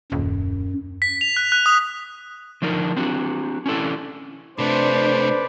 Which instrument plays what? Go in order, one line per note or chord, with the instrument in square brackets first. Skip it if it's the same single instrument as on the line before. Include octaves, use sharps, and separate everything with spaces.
[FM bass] D#1 [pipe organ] F#2
[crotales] B6
F7
F#6
F#6
D#6
[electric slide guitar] D3 F3 D4 D#4 A#4
C4 D4 F#4
C#4 D4 E4 A4 D5
[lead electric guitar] C3 A3 [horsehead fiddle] D4 [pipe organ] B4 D5 [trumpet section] C5